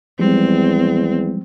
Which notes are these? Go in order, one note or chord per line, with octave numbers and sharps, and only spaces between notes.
E2 F3 G3 G#3 C4